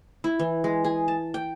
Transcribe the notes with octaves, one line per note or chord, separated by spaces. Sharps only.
E4
E3
G#3
G#4
A5
G5